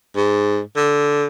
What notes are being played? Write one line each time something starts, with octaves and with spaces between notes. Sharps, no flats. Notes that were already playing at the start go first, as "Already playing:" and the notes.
G#2
D3